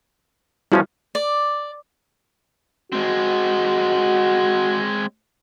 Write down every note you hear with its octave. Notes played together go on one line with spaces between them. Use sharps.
E2 F3 G3 C#4 E4 F#4
D5
G#3 C4 F#4